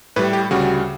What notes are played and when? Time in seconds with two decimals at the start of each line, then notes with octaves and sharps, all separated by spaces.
0.16 A2 G3 B4
0.33 G4
0.51 D2 C#3 G3 F#4